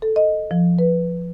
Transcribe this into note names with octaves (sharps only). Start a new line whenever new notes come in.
A4
D#5
F3
B4